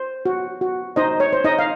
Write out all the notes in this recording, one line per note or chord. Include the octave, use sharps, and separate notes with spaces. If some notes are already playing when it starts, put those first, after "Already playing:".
Already playing: C5
F#4
F#4
D#4 C5 D#5
C#5
C5
D#4 D#5
F5